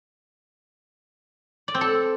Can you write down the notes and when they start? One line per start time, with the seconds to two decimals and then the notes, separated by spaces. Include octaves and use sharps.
1.68 D5
1.75 C4
1.81 A4